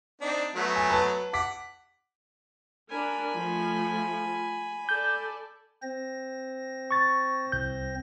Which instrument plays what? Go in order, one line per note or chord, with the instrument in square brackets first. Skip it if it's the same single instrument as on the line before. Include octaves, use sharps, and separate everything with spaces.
[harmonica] C4 D4 D#4
F#3 A3 B3
[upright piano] G#5
B4 A5
[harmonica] F#5 [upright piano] D6 B6
[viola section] D4 A#4 [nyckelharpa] G#5 B5
[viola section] F3 A3
[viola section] A4 D5 [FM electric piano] G6
[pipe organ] C4 C5 A#6
[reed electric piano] C#6 A6
C2 G6